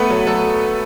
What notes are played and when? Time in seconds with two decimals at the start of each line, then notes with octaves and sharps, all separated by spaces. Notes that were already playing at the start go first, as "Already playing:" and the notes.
Already playing: A3 B3 B4
0.10 F#3
0.27 F#3 A4